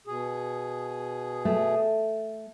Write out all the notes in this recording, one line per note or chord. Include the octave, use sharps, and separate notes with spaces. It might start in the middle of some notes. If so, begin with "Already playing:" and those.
B2 G#4
A3